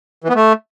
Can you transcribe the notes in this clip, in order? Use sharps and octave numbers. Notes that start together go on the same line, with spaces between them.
E3
B3
A3